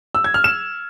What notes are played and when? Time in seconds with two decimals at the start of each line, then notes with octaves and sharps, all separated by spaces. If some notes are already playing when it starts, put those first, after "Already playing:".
0.15 E6
0.24 G#6
0.34 F6
0.44 E7